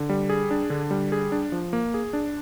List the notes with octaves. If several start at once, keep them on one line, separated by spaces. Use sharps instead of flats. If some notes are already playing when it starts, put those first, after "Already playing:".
Already playing: D3
G3
G#4
D4
D3
G3
G#4
D4
F3
A#3
G#4
D4